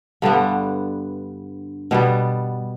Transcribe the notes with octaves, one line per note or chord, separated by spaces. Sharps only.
G2 D3 G3 B3
B2 G3 B3